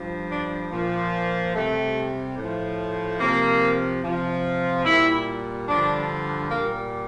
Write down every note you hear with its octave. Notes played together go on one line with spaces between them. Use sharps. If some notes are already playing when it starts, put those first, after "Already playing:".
Already playing: G2 F3
D4
A#2 F3
C3 G3 A3
A2 F3
C3 F3 A#3
C3 F3
A#2 G3 E4
G2 D3 F3 D4
A#2 G3 A#3